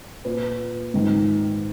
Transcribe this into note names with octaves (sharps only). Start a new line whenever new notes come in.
A#2 B4
G#2 D#3